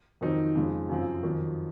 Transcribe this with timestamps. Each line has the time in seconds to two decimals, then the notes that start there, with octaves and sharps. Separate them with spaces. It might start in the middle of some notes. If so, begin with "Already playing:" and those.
0.21 F2 D#3 F#3 C4 D#4
0.56 F2 C#3 G#3
0.89 F#2 C#3 F3 C4
1.23 F2 D#3 F#3